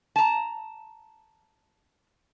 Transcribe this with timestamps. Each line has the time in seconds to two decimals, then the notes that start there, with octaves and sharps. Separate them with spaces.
0.16 A5 A#5